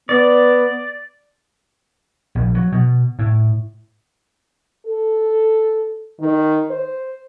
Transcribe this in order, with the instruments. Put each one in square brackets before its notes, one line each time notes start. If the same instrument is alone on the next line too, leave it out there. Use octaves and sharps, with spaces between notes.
[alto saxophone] B3 [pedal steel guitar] D5
[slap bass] A#1
F#3
B2
A2
[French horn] A4
D#3
C5